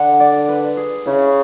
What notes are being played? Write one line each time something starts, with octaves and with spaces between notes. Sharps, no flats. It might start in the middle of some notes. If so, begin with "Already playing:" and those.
Already playing: D3 F#5
D5
B4
G#4
C#3 E4